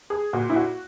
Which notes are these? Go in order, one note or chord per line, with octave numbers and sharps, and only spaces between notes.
G#4
A#2 F#4
E4
F#4